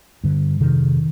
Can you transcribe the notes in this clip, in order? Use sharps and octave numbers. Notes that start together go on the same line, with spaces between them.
G2 D3
F2 C3 D#3